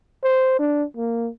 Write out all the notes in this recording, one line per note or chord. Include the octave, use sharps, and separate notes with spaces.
C5
D4
A#3